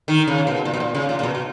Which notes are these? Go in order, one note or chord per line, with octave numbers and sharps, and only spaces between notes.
D#3
C#3
B2
A#2
B2
A#2
C#3
A#2
A#2
B2
B2